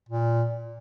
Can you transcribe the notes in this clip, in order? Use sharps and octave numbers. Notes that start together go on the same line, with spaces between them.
A#2